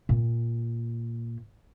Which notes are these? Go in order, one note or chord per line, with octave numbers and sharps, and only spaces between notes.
A#2